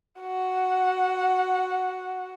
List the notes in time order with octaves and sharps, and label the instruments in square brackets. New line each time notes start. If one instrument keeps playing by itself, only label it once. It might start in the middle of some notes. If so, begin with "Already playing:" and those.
[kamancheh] F#4 F#5